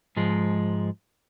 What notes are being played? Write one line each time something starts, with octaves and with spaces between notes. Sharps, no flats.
G#2 F3 G#3